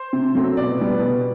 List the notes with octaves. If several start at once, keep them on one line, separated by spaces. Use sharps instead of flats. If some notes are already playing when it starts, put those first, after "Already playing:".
Already playing: C5
C3
F#3 A3 C4
B2 D5
G3 B3
B2